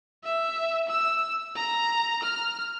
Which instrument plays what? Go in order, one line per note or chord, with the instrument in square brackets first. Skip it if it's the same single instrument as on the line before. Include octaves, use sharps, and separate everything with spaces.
[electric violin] E5
E6
A#5
F6